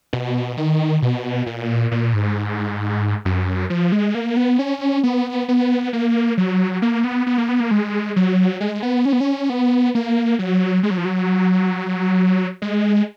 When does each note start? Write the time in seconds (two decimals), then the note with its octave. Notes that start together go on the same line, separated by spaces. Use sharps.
0.13 B2
0.57 D#3
1.02 B2
1.46 A#2
1.91 A#2
2.13 G#2
3.25 F#2
3.70 F3
3.92 G#3
4.15 A#3
4.37 B3
4.59 C#4
5.03 B3
5.48 B3
5.93 A#3
6.37 F#3
6.82 A#3
7.04 B3
7.27 B3
7.38 A#3
7.49 B3
7.60 A#3
7.71 G#3
8.16 F#3
8.60 G#3
8.83 B3
9.05 C#4
9.13 B3
9.20 C#4
9.50 B3
9.95 A#3
10.39 F#3
10.83 G#3
10.90 F#3
10.98 F3
11.05 F#3
12.62 G#3